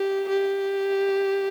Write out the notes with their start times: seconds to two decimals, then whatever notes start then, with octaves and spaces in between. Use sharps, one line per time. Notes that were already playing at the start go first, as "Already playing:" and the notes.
Already playing: G4
0.29 G4